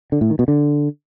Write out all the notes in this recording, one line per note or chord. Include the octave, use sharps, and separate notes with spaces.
D3
A2
D#3
B2
D3